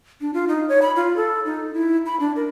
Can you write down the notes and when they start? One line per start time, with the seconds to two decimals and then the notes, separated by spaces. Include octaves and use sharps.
0.21 D4
0.34 F4
0.48 D#4
0.69 C#5
0.82 B5
0.96 F4
1.16 A4
1.45 D#4
1.74 E4
2.06 B5
2.20 D4
2.36 A#4